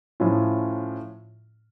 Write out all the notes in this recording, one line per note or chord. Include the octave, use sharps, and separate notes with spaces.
A2 F3 C#4 F4